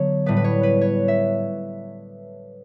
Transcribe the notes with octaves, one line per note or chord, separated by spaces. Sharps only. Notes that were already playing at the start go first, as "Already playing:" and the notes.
Already playing: D3 F#3 B3 C#5
A2 G3 B3 B4
B4
C#5
B4
C#5
E5